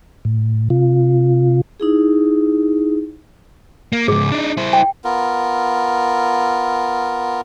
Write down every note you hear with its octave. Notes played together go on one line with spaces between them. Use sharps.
A2
C3 F4
D#4 E4 G#4
A#3
C#2 G#2 G#4
D4 D#4
E4 C5
G5
B3 F4 A#4